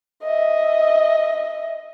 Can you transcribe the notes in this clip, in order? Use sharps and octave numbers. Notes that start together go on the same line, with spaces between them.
D#5 E5